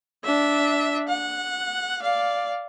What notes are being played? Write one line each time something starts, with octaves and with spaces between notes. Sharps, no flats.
D4 E5
F#5
D5 F5